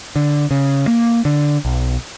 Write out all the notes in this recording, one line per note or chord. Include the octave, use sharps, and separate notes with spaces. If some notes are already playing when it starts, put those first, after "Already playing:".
D3
C#3
A#3
D3
B1